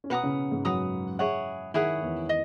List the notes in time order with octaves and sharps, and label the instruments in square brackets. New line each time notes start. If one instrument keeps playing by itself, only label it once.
[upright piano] C#4
[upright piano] B2 B3 [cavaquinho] B4 F#5 A#5 D#6
[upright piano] C#3 C#4
G#2 G#3
[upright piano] F#2 F#3 [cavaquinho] B4 F#5 A#5 D#6
[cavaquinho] E4 G#4 C#5 F#5
[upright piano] D#3 [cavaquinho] E4 G#4 C#5 F#5
[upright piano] E2 E3
[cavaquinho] D#5